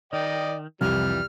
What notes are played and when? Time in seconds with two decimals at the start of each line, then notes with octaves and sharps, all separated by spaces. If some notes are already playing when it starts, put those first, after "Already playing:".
0.13 D#3 D5 D#5 G5
0.81 C2 F2 E3 G3 F6